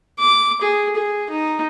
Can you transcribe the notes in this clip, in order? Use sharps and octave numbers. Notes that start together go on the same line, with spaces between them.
D6
G#4
G#4
D#4